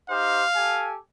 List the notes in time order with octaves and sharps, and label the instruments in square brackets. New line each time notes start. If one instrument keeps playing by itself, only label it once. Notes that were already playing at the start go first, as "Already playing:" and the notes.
[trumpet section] D#4 G4 C5 [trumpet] F5
[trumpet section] G4 A4 G#5